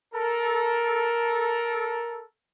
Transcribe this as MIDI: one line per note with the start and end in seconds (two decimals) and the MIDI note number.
0.14 2.24 69
0.14 2.24 70